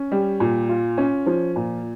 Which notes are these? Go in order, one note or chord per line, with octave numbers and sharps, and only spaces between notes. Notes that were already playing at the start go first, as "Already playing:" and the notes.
Already playing: C#4
G3
A#2
F4
C#4
F3
A#2